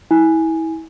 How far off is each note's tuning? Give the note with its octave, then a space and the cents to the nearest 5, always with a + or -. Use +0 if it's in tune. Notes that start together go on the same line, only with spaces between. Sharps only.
E4 -30 G#5 +0